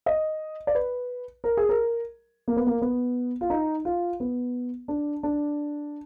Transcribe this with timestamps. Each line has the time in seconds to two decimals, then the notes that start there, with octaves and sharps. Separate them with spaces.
0.06 D#5
0.67 D5
0.75 B4
1.44 A#4
1.57 G#4
1.69 A#4
2.48 A#3
2.57 B3
2.67 A#3
2.82 B3
3.41 F4
3.50 D#4
3.85 F4
4.20 B3
4.88 D4
5.23 D4